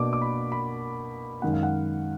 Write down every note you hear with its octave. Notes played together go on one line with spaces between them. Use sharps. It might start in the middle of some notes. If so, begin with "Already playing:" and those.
Already playing: B2 A#3 D4 D6
D6
B5
B5
F#2 D#3 G#3 F#5
F5
F#5